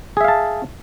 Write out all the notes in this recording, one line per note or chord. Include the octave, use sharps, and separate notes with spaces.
G#4 E5 F5 A5